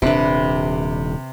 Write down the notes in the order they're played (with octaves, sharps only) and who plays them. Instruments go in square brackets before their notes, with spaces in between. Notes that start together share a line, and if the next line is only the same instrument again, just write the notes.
[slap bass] D#1 D4 [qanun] C3 B4